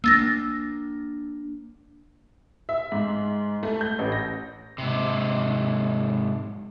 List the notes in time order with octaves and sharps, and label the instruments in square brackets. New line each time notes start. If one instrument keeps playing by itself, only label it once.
[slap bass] A#3 D4 [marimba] E6 A6 A#6
[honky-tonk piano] E5
G#2
A3
G6
A1
A#6
[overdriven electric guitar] G#2 C3